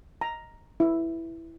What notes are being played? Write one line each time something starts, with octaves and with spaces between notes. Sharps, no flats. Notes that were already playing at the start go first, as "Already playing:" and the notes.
A#5
E4